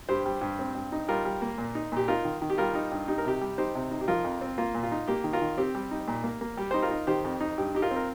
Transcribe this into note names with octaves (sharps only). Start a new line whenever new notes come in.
G2 G4 C5
G3
G2
C4
G2
D#4
G3 F4 A#4
G3
A#3
A#2
D#4
A#2 G4
D#4 F4 A#4
D#3
D#3
G4
G3 F4 A#4
D#4
G2
D#4 G4
A#4
C3 G4
G3
D#4 G4 C5
C3
D#4
G4
F3 F4 A#4
F2
C4
A#3 F4
A#2
F4
D#4
A#3 G4
D#3
F4 A#4
D#3
C4 G4
G3
D#4
A#2
A#3
A#3
G3 G4
D#4 C5
F4 A#4
D#4
D#3 G4 C5
F2
D#4
G2 G4
D#4 G4
F4 A#4
C4
A#4